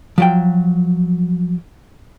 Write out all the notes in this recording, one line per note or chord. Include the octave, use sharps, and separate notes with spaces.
F3 F#3 G5